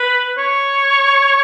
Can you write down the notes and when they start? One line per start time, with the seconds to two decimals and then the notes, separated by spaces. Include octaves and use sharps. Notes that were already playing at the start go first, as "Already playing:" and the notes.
Already playing: B4
0.38 C#5